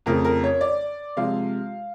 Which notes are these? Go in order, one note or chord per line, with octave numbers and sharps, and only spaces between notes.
F2 C#3 F3 A3 A#4
A#4
C#5
D5
C3 F3 G#3 F5